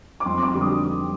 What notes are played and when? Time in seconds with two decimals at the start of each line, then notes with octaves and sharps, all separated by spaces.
0.20 D6
0.26 F2 C6
0.43 D6
0.53 D3 G3
0.61 D#6